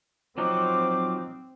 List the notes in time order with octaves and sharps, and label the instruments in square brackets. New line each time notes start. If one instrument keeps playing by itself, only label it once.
[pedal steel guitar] F3 F#3 D#4 [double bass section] C4 [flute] D6